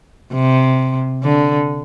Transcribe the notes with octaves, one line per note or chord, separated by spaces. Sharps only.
C3
D3